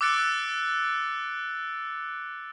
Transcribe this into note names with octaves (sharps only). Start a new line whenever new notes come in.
D6 E6 F#6 A6 C#7 D7